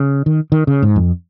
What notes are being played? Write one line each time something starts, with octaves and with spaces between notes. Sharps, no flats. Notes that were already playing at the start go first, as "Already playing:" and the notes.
Already playing: C#3
D#3
D#3
C#3
G#2
F2